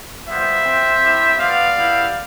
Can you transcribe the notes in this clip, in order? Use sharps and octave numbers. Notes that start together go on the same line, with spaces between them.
G3 B3 F4 C5 E5
C4 F4
C4 E4 G4
B3 F4 D5 F5
B3 E4 G4